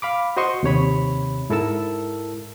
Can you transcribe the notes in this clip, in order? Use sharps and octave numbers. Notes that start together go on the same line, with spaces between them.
F5 B5 D6
F#4 C5 D#5 C6 C#6
D#2 C3 C#5 B5
G#2 E4 A4 A#4 A5 E6